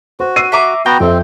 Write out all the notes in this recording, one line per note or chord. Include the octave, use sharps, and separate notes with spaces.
F#4 C5
E6 C7 D#7
E5 A#5 D6
B3 F#4 G5 A#5
F2 C4 E5